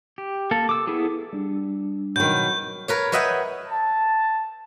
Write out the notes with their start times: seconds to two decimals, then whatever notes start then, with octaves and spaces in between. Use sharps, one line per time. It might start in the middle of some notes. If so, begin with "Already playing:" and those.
0.18 G4
0.51 A#3 A4
0.69 D6 E6
0.87 B3 E4 G#4 A4
1.33 G3 D4
2.16 B2 D#3 F#3 G6
2.88 A#4 B4 C#5
3.12 B4 C#5 D#5 E5 F#5 G5
3.68 A5